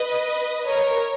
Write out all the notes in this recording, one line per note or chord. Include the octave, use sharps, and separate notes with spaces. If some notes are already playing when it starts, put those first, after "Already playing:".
Already playing: B4 D#5
A#4 C#5